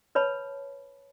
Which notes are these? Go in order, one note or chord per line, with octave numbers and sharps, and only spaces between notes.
B4 C#5 A5 B5